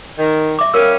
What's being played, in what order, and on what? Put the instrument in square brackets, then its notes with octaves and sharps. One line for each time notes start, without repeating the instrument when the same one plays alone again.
[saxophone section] D#3
[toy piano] E5 D6
[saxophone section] G3 C#4 F5 [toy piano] A#4 E6